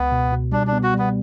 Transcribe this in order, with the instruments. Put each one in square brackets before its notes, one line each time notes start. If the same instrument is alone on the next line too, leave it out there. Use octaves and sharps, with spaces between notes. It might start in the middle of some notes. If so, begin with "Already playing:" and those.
Already playing: [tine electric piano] C#2 [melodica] B3
[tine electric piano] B2
B2
[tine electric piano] G3 [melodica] D4
[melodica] D4
[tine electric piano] B3
[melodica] F#4
[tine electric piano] G3 [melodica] B3